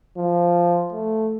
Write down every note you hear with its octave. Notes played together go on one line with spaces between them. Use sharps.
F3
A3